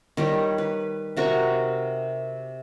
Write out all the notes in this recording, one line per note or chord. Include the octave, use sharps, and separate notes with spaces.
D#3 G3 G4 C#5
B4
C3 F#4 A#4 C#6